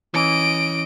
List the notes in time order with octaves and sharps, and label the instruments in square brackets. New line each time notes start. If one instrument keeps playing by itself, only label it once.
[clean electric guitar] E3 C#4 [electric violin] D#5 D7